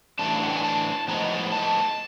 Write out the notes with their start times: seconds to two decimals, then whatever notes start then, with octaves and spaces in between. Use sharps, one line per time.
0.19 A2 E3 A3 D4 A5
0.35 F5
0.43 F#5
0.50 G5
0.57 G#5
0.63 A5
1.08 A2 F3 G#3 B3 D#4 A#5
1.52 A5